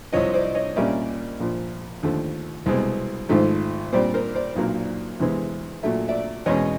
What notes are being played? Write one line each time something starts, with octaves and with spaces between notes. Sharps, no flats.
C2 C3 F3 C#5 D#5
C5 D5
C#5 D#5
A#2 G3 A#3 C#4 D5 E5
A#1 A#2 F3
D#2 D3 F3 A3
C2 B2 G#3 C4
G#1 G#2 F3 A3
A#2 G3 C4 C5 D5
A#4 C5
C5 D5
B1 A#2 F#3 A#3
E2 C3 E3 G#3 B3
A#2 F#3 A3 E5
D5 E5
E2 B2 G#3 C#4 C#5 D#5